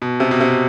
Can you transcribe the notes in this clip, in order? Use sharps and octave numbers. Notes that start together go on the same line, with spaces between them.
B2
C3
B2
C3